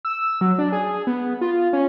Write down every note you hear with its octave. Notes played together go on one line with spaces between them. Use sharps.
E6
F#3
D4
G#4
B3
F4
C#4